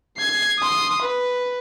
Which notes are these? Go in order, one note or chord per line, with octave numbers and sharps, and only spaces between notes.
G#6 C7
C6 D#6
B4